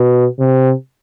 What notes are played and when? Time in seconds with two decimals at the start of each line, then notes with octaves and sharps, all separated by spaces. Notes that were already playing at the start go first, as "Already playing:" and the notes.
Already playing: B2
0.39 C3